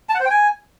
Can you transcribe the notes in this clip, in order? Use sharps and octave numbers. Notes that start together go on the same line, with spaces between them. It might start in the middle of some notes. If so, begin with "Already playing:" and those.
A5
F#5
C5
G5
G#5